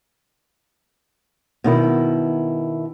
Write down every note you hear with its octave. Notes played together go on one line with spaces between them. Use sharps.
B2 D#3 E4